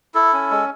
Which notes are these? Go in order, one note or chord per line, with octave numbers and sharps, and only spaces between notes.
E4 A4
C#4
G#3